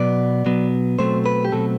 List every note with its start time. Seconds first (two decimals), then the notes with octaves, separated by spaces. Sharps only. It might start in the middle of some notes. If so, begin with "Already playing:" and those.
Already playing: B2 F#3 B3 D5
0.45 B2 F#3 B3
0.99 B2 F#3 A3 C4 C5
1.26 B4
1.45 G4
1.52 B2 F#3 A3 C4 A4